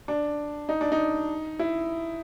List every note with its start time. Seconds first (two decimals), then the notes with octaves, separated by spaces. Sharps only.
0.08 D4
0.69 D#4
0.81 D4
0.92 D#4
1.59 E4